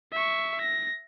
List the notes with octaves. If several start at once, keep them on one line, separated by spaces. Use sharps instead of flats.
E5 C#6
A#6